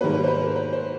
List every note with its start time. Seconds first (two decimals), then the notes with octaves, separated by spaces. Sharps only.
0.01 G#2 D#3 G3 A#3 B4
0.14 B4
0.24 C5
0.28 B4
0.41 A#4
0.56 B4
0.73 C5